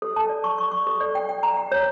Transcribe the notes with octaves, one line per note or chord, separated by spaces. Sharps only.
A4
A5
D5
C#6
C#6
C#6
A4
D5
G5
G5
A#5
G5
C#5